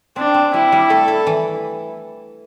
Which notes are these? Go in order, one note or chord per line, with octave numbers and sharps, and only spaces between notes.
C4 D4
C4
G3 E4
G3
A3 A4
E4
E3